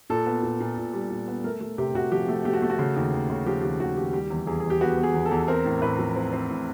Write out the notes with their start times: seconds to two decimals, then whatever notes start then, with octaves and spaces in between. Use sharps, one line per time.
0.10 A#2 A4
0.26 B3
0.43 A#2
0.60 A#2
0.77 A#2
0.93 G3
1.11 A#2
1.28 B3
1.44 A3 A#4
1.61 A3
1.78 C3 G4
1.95 C3 F#4
2.12 F3 G4
2.28 A3
2.45 A3 G4
2.53 F#4
2.62 A3
2.70 F#4
2.79 C#3
2.96 D#2
3.13 D#2
3.30 C#3
3.46 F3 G4
3.63 D#2 G4
3.80 D#2 F#4
3.97 D#2 G4
4.13 G3 G4
4.31 E2
4.47 E2 G#4
4.60 E2 G#4
4.70 G4
4.81 B3 F#4
4.98 B3
5.03 G#4
5.14 E2
5.25 A4
5.31 E2
5.48 C4 A#4
5.65 A2
5.82 A2 B4
5.99 F3
6.16 C4
6.33 C4
6.49 A2